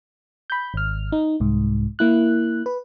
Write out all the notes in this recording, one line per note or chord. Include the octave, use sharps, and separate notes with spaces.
B5 G6
G#1 F6
D#4
C2 G#2
A#3 E4 F#6
B4